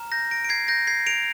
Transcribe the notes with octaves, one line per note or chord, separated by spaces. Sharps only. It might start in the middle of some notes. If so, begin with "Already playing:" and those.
Already playing: A#5 F6
G6 A#6
A#6 D7
D7
G#6 C7
G6 A#6
G#6 C7
D7 F7